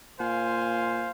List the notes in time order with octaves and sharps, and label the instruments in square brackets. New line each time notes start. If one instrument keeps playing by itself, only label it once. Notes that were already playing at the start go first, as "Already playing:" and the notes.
[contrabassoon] A#2 [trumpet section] C5 F5 G#5